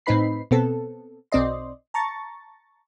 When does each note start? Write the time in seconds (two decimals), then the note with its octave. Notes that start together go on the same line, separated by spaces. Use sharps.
0.06 A2 C4 D#4 B4 B5 C7
0.51 B2 B3 C4 A4
1.32 B1 C4 D5 D#5 C6
1.94 A5 A#5 C#6 A6